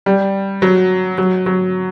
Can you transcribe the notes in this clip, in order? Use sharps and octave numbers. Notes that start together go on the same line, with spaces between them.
G3
F#3
F#3
F#3